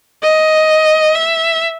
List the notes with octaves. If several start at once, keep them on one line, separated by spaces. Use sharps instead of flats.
D#5
E5